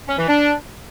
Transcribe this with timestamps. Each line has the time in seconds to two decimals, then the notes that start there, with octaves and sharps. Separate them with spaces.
0.08 C#4
0.18 E3
0.28 D4